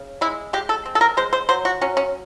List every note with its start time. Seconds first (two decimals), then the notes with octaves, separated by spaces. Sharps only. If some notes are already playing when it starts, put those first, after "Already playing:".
Already playing: C#3
0.21 G#3 E4
0.53 G#3 G4
0.69 A4
0.86 C4
0.95 A4
1.01 A#4
1.17 G#3 C5
1.33 C5
1.49 F#3 C5
1.65 F#4
1.81 F#3 C#4
1.97 C#4